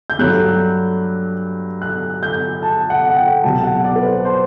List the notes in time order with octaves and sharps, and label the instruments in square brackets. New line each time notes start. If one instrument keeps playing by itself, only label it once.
[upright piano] G6
G2 F#3 A3 F#6
F#6
G6
A5
F#5
F#5
G5
C2 B2 F#3 A5
F#5
D5
B4
C5
C5